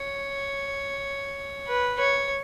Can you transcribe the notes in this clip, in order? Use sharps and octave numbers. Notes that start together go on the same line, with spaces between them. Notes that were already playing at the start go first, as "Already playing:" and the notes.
Already playing: C#5
B4
C#5